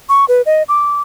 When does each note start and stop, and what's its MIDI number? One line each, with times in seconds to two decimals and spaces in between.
0.09 0.25 85
0.28 0.42 71
0.46 0.63 75
0.68 1.02 86